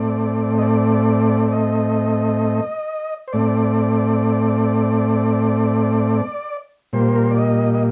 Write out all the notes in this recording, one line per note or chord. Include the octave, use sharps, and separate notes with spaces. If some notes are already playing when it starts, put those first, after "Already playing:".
Already playing: A2 A3 C4 D5
D#5
D5
D5
D#5
C5
A2 A3 C4 D5
A#2 G3 A#3 C5
A#4
C5
D5
D#5
D#5